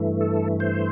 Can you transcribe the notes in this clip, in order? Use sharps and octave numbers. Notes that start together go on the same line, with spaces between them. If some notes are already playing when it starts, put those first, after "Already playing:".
Already playing: G2 E3 A3
A4
C5